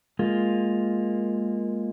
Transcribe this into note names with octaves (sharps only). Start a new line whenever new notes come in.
G#3 A#3 F4